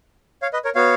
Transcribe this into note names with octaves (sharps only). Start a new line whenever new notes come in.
C#5 F5
B4 D#5
A#4 C#5
B3 F#4 C#5 F5